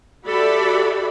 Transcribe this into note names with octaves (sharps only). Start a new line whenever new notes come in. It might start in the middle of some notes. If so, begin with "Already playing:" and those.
F#4 G4 A4 D5 E5 B5